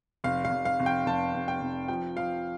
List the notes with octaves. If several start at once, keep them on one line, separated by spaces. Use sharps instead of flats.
F1 F5
F5
F1
F5
F1
G5
F1 A5
F1
G5
F1
F3 G5
F3 F5